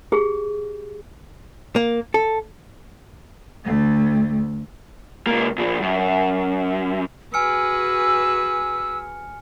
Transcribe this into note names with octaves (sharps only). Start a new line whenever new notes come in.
G4 G#4
A#3
A4
D2 A3
C#2 A#3
A#2 F3
F#2
F#4 G#4 B4 G#5 E6 F6 C#7